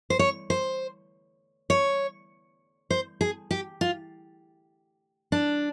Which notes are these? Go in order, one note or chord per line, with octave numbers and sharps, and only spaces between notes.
C5
C#5
C5
C#5
C5
G#4
G4
F4
D4